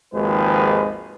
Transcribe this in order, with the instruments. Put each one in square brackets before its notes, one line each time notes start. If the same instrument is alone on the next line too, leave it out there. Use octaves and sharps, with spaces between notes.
[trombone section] G#1 D#2 D#3 F3 G#3 B4